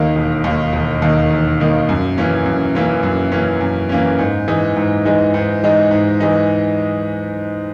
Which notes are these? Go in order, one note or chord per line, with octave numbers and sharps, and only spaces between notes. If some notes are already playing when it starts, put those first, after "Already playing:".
Already playing: D#2 D#3 A#3 D#4
E1
D#2 D#3 A#3 D#4
E1
D#2 D#3 A#3 D#4
E1
D#2 D#3 A#3 D#4
F#2
E3 A#3 C#4
F#2
E3 A#3 C#4
F#2
E3 A#3 C#4
F#2
E3 A#3 C#4
G#2
E3 G#3 D#4
G#2
E3 G#3 D#4
G#2
E3 G#3 D#4
G#2
E3 G#3 D#4